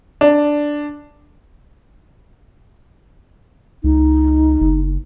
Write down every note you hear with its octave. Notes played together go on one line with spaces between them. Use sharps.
D4
C#2 D#4
F#1